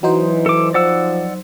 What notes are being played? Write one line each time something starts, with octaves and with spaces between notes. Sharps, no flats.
E3 F#3 D#4 C5
A4 D6
F3 D5 F#5 E6